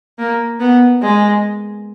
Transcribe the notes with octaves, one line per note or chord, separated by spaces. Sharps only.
A#3
B3
G#3